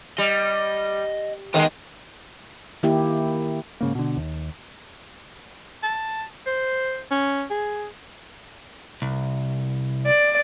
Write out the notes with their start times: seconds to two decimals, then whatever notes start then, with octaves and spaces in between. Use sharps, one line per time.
0.18 G3 D#5
1.54 C3 D#3 G#3 B3 D#4
2.83 D#3 A#3 E4 G4
3.81 G#2 C#3 A#3
3.95 B2 D3
4.17 D#2
5.83 A5
6.46 C5
7.11 C#4
7.50 G#4
9.02 C2
10.06 D5